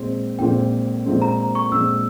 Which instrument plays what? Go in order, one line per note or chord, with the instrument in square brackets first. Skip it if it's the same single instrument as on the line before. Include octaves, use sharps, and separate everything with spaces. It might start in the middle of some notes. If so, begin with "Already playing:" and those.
Already playing: [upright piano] A#1 A#2 G#3 C4
[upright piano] A#1 A#2 G#3 C4 [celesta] G5
[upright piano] A#1 A#2 G#3 C4
[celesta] A#5
A#5
C#6
[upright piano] A#1 A#2 G#3 C4 [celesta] E6